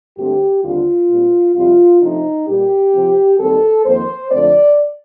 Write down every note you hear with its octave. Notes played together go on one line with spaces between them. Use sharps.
G2 D3 A3 C4 G4
D#2 D3 G3 C4 F4
A#2 G3 C4
F2 C3 G3 C4 F4
C3 F3 A3 D#4
A#2 G3 A#3 G4
C3 F3 C4
D#2 D#3 G3 C4 A4
F2 D#3 A#3 C5
F2 D3 F3 A3 C4 D5